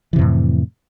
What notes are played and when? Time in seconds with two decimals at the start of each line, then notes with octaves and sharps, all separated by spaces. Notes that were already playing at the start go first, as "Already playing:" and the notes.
0.13 E3
0.16 C3
0.19 F2
0.21 A2